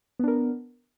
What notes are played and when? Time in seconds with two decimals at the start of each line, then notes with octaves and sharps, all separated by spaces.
0.19 B3
0.24 D4
0.28 A#4